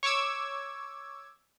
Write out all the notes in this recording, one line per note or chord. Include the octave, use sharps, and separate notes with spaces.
C#5 C#6 D6 E6 G#6